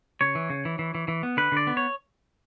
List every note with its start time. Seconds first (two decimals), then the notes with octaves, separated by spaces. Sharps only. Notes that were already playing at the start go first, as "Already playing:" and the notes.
0.21 C#3 C#5
0.35 E3
0.50 C#3
0.65 E3
0.79 E3
0.95 E3
1.08 E3
1.23 B3
1.37 D3 B4
1.52 D3 D5
1.67 B3
1.77 C#5